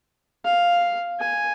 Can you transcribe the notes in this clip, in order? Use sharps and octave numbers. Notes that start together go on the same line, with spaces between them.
F5
G#5